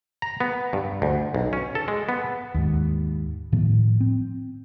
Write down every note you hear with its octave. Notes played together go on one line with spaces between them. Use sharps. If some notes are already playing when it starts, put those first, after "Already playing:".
A#5
B3
G2
D2
B1
C#4
A4
G#3
B3
D#2 G#2
A2 D#3 F3 B3
C4